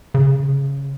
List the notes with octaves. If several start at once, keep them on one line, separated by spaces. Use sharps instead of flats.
C#3